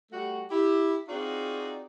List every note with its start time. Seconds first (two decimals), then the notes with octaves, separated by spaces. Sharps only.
0.12 G3 A3 F#4
0.50 E4 G4
1.08 C4 D#4 F4 F#4 G#4 D5